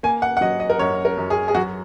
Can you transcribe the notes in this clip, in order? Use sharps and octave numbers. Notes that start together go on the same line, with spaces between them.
A#3 G#5
F#5
F#5
F#3 D#5
D#5
A#4
F#2 C#5
A#4
F#2
G#4
G#4
F#3 F#4